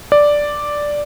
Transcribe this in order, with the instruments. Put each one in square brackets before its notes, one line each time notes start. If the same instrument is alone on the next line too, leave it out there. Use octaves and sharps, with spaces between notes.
[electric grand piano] D5